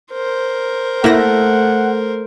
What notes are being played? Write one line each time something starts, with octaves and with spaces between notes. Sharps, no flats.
A#4 C5
A3 A#3 E4 F#5 A#6